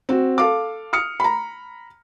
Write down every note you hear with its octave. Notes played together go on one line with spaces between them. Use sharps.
C4 F#4
A4 F5 D6
D#6 F6 C#7
A#5 B5